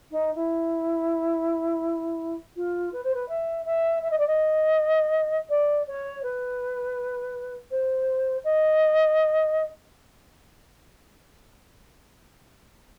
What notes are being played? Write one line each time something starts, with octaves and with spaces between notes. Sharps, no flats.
D#4
E4
F4
B4
C5
B4
E5
E5
E5
D#5
D5
D#5
D5
C#5
B4
C5
D#5